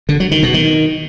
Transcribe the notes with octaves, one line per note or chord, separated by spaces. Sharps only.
D3
F#3
D#3
B2
D#3